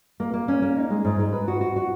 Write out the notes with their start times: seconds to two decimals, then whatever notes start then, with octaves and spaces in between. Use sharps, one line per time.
0.20 A#3
0.34 A#3
0.48 C#4
0.62 A#3
0.77 D#4
0.90 G#3
1.05 G#2
1.19 G#2
1.33 B4
1.48 F#4
1.61 F#4
1.76 F#4